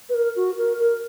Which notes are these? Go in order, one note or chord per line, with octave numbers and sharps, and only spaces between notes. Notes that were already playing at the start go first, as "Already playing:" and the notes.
B4
A#4
F#4
A#4
A#4